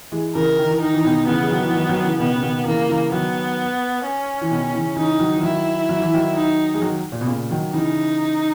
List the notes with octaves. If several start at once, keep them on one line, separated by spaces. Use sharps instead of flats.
E3 G#3
C#3 E3 A#4
D#3
E3
D#3 D#4
E3
B2 D#3
C#3 E3 B3
G#3
D#3 F#3
E3
D#3 F#3
D#3 F#3
C#3 E3
B2 D#3 B3
C#3
B2 D#3
C#3 E3 A#3
C#3 E3
D#3 F#3 B3
C#4
E3
B2 D#3
C#3 E3
C#3 E3 D#4
D#3 F#3
E3
D#3 F#3 E4
F#3
E3
D#3 F#3
D#4
G#3
D#3 F#3
A#2
B2
A#2 C#3
D#3 F#3
C#3 E3 D#4